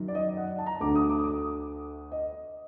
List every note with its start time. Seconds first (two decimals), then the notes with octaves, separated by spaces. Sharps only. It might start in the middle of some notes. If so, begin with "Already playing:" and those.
Already playing: F#2 D#3 F#3
0.08 D5
0.15 D#5
0.37 F#5
0.58 A5
0.66 A#5
0.80 D2 D3 A3 D6
0.95 D#6
1.09 D6
1.19 D#6
1.24 D6
2.12 D#5